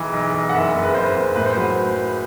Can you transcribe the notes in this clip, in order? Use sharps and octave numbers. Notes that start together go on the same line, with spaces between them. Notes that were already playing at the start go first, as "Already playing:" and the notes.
Already playing: B1 E3
B1
B1
F#5
F#1 E5
F#1
B4
F#1 C5
F#1
A2 B4
C5
F#3 B4